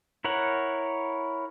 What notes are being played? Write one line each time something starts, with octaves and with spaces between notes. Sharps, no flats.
E4 A#4 C#5 F#5